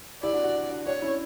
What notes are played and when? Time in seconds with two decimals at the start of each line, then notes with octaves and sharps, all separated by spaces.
0.22 E4 G4 D5
0.33 D4 F#4
0.44 D4 F#4
0.70 D4 F#4
0.86 D4 F#4 C#5
1.02 C#4 E4